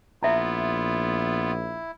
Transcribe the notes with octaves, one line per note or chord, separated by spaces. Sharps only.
A#1 B3 E4 F4 E5 A#5